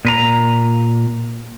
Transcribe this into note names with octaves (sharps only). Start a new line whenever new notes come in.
A#2 B4 A#5